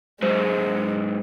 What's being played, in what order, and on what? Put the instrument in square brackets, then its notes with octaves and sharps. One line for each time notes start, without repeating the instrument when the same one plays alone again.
[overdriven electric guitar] G#2 F#3 [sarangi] G#3 [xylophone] C5